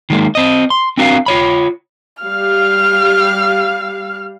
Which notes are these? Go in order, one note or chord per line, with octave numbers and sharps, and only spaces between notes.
D#3 G#3 A#3
C4 D#5
C6
C4 D4 F#4 A#4 F5
F4 C#5 B5
G3 F5 F6